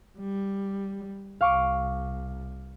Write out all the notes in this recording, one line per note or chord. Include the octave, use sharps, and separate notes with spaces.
G3
C2 F5 C#6 D6